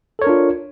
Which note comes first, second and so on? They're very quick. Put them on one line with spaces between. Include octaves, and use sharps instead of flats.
A4 C#5 A#4 D4 F4